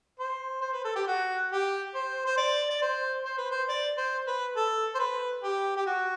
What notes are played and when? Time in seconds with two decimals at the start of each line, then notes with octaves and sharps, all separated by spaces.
0.20 C5
0.61 C5
0.73 B4
0.84 A4
0.96 G4
1.08 F#4
1.51 G4
1.94 C5
2.26 C5
2.38 D5
2.70 D5
2.82 C5
3.25 C5
3.38 B4
3.51 C5
3.68 D5
3.97 C5
4.27 B4
4.56 A4
4.95 C5
4.99 B4
5.43 G4
5.76 G4
5.86 F#4